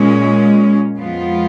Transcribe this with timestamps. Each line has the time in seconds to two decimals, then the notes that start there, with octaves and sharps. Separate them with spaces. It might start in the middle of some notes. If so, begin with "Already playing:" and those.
Already playing: A#2 G#3 C#4
0.99 F2 F3 G#3 B3 F4